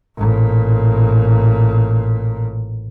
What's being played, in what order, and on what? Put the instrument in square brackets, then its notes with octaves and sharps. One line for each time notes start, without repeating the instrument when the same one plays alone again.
[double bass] A1 A#2